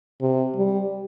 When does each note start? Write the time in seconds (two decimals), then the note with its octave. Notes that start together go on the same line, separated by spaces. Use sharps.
0.21 C3
0.56 G3